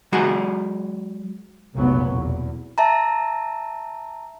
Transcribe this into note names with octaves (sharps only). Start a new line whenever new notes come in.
F#3 G#3 F#4 G#4 G#5 A#5
F1 B1 A#2 F#3 B3
E2
E5 A5 A#5